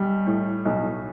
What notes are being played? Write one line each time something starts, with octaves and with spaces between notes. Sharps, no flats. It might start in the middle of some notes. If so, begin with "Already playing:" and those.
Already playing: B1 G3
A2
B1